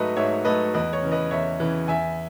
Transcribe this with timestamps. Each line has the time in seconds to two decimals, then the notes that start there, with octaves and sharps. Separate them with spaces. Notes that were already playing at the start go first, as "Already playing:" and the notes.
Already playing: G#2 F#3 A3 B4 D#5 E5
0.17 G#2 C#5 E5
0.45 F#3 A3 B4 D#5
0.74 E2 B4 D#5
0.93 C#5
1.03 C#3 E3
1.12 B4 D#5
1.31 E2 C#5 E5
1.60 C#3 E3
1.88 E2 E5 G#5